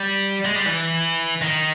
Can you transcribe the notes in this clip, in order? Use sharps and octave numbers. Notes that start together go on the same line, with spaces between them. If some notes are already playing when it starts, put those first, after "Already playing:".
Already playing: G3
G#3
G3
E3
D#3